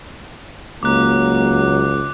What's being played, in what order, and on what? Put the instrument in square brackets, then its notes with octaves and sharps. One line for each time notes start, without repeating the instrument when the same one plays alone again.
[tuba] C#2 [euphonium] F#3 [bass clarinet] A#3 [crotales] D6 F#6